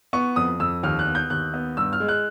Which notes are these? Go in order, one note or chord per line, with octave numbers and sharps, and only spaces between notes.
B3 C#6
F2 D#6
F2 E6
D#2 F6
F#6
B3
G6
D#2 F#6
B3
G2 E6
F6
G#3
F#6